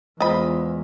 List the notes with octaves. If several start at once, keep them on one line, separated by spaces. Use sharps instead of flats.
E2 G#3 F4 C5 D#5 B5